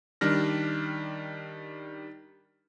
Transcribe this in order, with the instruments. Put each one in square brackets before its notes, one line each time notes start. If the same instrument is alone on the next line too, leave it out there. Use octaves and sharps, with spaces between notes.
[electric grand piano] D#3 G3 D4 F6 A#6